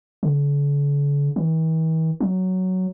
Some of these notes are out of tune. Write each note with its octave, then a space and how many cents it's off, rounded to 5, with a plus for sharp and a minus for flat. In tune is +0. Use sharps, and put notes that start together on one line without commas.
D3 -45
E3 -45
F#3 +5